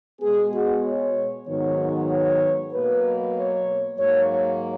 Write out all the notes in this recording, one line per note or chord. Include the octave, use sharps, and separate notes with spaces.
B2 G#3 B3 G#4
F#4
C#5
G#2 D#3 F#3 B3 C#5
C#5
B2 F#3 A#3 B4
C#5
G#2 F#3 A#3 C#5
C#5